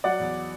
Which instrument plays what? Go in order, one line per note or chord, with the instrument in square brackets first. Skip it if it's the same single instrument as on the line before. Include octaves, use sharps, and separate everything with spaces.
[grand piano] F#3 D5 F#5
E2